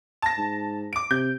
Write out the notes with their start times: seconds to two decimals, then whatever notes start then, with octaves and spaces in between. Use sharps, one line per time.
0.22 A5 A#6
0.38 G#2
0.93 D6 D7
1.11 C3 G6